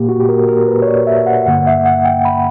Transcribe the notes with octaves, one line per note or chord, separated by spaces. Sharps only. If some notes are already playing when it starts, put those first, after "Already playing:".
Already playing: A#2 A#3 G4
F#4
G4
A#4
A#4
B4
C#5
D5
E5
F#5
G2 D3 A#3 F#5
E5
F#5
G5
B5